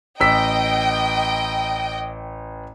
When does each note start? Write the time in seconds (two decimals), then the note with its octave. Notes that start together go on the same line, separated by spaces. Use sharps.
0.20 A1 D#5 G5 E6 B6